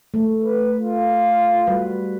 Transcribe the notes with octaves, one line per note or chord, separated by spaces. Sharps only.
A3
B4
F4
G3 F#4 B4